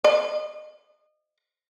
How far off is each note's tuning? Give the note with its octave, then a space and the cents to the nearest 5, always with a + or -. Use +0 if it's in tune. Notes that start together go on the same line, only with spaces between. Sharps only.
D#5 -30